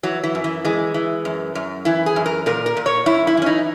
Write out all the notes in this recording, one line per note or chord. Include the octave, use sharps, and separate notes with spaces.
E3 F#3
E3
F#2
E3
E3 G#3
E3
F#2
F#2
E3 E4
G#4
F#2
A#4
A#2 A#4
A#4
A#2
C#5
F#2 E4
E4
E3 C#4
D#4